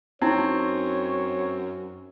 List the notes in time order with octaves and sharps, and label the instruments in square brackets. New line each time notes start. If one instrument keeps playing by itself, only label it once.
[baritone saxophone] F#2 [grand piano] C4 [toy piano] D#4 E4 [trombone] C#5